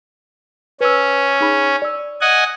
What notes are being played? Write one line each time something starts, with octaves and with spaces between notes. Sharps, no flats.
C#4 B4 E6
D#4 G#4 B5
D5 E6
D#5 F#5 G#5